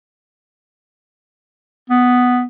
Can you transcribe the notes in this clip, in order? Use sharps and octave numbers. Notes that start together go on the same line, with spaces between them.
B3